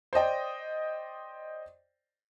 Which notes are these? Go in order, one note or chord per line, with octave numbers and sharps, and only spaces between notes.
C5 D5 D#5 G5